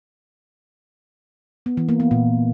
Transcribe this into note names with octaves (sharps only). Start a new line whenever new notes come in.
B3
E3
A#3
B3
A#2